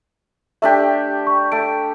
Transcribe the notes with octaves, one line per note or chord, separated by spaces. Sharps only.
A3 D4 G4 E5
C#6
A3 D7